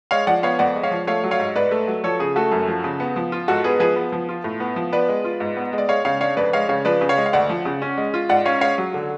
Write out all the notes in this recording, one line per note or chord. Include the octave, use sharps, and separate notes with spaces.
G#3 C#5 F5
F3 D5 F#5
B3 C#5 F5
F2 D5 F#5
G#3
C#5 F5
F3
A3 C#5 F5
F#3
C#5 F5
G#2
G#2 B4 D5
A3
F#3
F3 A4 C#5
C#3 G#4
A3 F#4 A4
F#2
F3
C#3
B3
F3
F4
G#2 F#4 A4
B3 G#4 B4
F3 G#4 B4
B3
F3
F4
A2
B3
F3
B3 B4 D5
G#3
F4
G#2
B3
G#3
D5
G#3 C#5 F5
C#3 C#5 F5
D4 C#5 F5
F2 B4 D5
G#3 C#5 F5
C#3 C#5 F5
F3 B4 D5
C#3
C#5 F5
G#3
F5
D2 D5 F#5
F3
C#3
C#4
G#3
F4
G#2 D5 F#5
C#4 C#5 F5
G#3 C#5 F5
F#3
D3